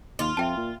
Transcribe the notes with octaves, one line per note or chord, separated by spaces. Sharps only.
D#2 F4
F2 E5 G5 A5
A#2